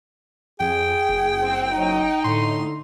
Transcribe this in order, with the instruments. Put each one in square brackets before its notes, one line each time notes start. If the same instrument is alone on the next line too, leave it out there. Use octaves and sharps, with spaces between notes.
[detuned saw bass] F2 [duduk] G#4 [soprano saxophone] G5
[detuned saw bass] F#1
[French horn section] C4
[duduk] F#3 [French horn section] D#4
[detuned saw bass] A2 [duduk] D3 [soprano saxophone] C6